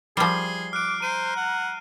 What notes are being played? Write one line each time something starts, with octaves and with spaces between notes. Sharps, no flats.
F3 G3 G#4 C7 G7
D6 F6 F#6 D7
C5 A#5 D#7
F#5